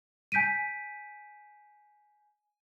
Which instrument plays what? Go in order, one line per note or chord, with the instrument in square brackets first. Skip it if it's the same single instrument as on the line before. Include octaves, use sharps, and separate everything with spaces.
[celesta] G#5 G6 B6 D7 D#7